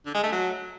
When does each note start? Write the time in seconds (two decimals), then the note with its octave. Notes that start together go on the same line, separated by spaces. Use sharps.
0.06 D3
0.14 G#3
0.23 A3
0.32 F#3